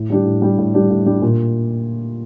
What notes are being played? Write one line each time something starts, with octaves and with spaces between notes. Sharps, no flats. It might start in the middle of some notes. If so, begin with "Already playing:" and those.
Already playing: A2
G3 D4 G4
A2
G3 D4 G4
A2
G3 D4 G4
A2
G3 D4 G4
A#2